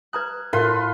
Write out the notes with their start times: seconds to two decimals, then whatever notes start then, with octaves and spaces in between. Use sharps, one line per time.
0.13 B4 A#5 D#6 F#6 G#6
0.53 A2 F4 A#4 B4 F5 C6